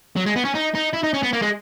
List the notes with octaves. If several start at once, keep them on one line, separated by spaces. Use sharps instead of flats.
F#3
G#3
B3
C#4
D#4
D#4
E4
D#4
C#4
B3
A#3
G#3